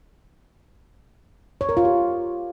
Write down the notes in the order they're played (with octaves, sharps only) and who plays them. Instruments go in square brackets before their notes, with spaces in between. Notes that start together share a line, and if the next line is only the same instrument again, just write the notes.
[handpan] C#5
A#4
F4
G4